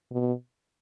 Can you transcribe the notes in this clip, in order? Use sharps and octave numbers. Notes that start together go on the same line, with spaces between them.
B2